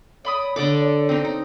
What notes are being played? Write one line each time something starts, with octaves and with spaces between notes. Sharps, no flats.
C#5 D5 B5 D#6
D3 A4 D5 D6
C4 D#4
D#4